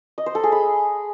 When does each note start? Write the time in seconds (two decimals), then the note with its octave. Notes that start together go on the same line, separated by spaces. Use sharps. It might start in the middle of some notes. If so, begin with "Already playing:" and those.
0.18 D#5
0.26 C5
0.35 A4
0.44 G#4
0.52 B5